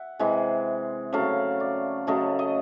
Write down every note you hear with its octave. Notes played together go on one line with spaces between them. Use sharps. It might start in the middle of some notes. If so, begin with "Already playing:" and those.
Already playing: E5 F#5
C3 E3 G#3
C#3 F#3 A3 F5
D5
C#3 F#3 A3 D#5
D#5